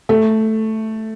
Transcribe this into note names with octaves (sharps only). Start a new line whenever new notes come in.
A3